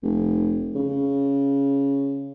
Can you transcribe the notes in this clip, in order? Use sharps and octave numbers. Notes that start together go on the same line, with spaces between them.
F1
C#3